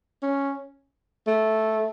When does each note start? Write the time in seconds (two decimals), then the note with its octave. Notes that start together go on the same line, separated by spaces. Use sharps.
0.22 C#4
1.27 A3